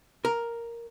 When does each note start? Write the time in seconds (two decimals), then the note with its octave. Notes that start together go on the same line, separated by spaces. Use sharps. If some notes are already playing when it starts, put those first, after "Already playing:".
0.25 A#4